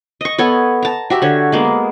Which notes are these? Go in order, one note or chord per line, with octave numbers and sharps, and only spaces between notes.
D#5 C#6
B3 A4 C#5
A5 A#5
F#4 G4 E5
D3 C#5
G#3 A#3 B3